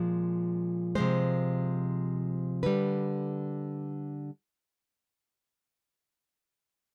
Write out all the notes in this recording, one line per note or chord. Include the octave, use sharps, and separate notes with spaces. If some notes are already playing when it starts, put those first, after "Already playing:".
Already playing: A#2 F3 G#3
C3 F3 G#3 C5
D3 G3 B4